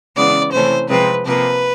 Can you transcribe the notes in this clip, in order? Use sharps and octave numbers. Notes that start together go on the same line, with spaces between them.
C#3 E3 G#3 B3 D5
C3 E3 A3 C#4 C5
C3 F3 G#3 C4 B4
C3 F3 A#3 B4